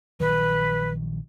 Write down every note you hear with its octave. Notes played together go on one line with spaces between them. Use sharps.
A#1 D#3 F#3 B4